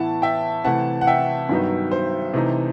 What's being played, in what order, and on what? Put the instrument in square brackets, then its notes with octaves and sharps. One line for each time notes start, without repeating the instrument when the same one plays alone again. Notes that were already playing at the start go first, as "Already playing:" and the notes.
Already playing: [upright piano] A2 E3 B3 E4 F#5 A5
E5 G5
C3 E3 A3 E4 F#5 A5
F#5
E5 G5
G2 D#3 F#3 B3 D#4
C5
C3 E3 A3 D#4